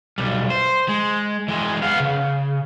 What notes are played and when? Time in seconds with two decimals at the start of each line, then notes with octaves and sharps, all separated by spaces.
0.18 B1 G3
0.50 C5
0.89 G#3
1.48 E3 G#3
1.82 B3 F5
2.00 C#3